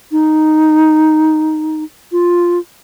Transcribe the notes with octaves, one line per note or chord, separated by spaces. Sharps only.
D#4
F4